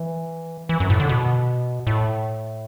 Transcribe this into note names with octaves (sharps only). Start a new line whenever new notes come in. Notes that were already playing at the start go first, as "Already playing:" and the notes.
Already playing: E3
E3
F#2
A2
D3
B2
A2